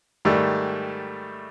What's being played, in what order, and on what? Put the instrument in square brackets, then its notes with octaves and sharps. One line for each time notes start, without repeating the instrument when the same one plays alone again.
[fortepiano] G#2 D#3 G3 A3